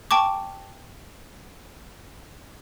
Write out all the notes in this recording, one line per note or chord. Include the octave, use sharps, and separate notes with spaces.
G5 A5 C#6 D6